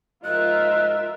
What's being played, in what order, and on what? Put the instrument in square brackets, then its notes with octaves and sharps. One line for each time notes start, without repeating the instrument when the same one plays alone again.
[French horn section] G#2 F3 D#5 [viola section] F4 A#4 E5 [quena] F#6